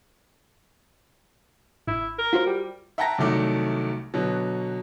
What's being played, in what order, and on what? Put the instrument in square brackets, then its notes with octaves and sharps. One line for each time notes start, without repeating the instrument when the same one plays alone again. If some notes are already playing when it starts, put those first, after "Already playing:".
[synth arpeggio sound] G#1 [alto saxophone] E4
[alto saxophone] A#4
[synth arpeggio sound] F4 F#4 C5
[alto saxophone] G3
[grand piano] E5 F#5 G5 A5 A#5 A#6
C2 D#3 F#3 A3 D6
B2 D3 F#3